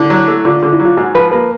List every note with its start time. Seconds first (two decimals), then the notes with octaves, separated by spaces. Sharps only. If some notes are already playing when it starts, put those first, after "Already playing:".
Already playing: D3 E4
0.10 F#3
0.28 A3
0.45 D3 F4
0.63 D3
0.73 E4
0.80 F#3
0.86 F4
0.97 G#2 F#4
1.14 F3 B4
1.32 A#3 B4